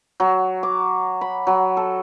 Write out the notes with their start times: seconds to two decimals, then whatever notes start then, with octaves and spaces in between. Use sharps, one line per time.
0.20 F#3
0.63 D6
1.21 B5
1.47 F#3
1.77 A4